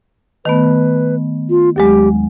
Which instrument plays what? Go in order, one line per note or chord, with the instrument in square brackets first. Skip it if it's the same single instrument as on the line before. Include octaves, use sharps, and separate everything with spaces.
[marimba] D#3 A3 B3 [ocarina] B4
[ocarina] F4
[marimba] D#2 F#3 G#3 [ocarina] G4